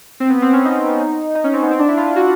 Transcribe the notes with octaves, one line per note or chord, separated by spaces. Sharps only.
C4
B3
C4
C#4
D#4
D#4
C#4
C4
B3
C4
D4
E4
F4
F#4